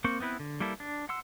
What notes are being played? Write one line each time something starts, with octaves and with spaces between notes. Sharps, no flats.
A#3 C4 C5 C#6
B3 C4 E4 B4
D3
G3 A#3 E4 A4
D4
F#5 C6 E6